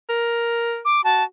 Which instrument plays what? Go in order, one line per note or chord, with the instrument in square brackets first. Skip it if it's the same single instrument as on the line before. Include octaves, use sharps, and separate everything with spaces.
[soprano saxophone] A#4
[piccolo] D6
[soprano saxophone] F#4 [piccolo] A5